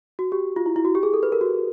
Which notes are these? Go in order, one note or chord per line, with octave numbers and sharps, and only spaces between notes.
F#4
G4
F4
E4
E4
F#4
G4
G#4
A4
B4
A#4
F#4